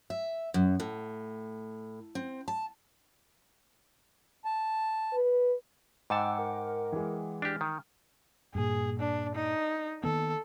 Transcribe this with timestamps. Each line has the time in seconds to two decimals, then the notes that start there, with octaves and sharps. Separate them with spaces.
0.10 E5
0.54 F#2
0.80 A2
2.15 C4
2.48 A5
4.45 A5
5.13 B4
6.10 G#2 F#5 G5 A5 D6 E6
6.38 A#4
6.92 E3 G#3
7.42 D4 G4 F6
7.61 D#3
8.55 G2 A#2 G#4
9.00 D4
9.35 D#4
10.04 D#3 A#3 B3 A4